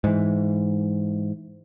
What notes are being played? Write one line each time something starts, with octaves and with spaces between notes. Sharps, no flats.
G#2 E3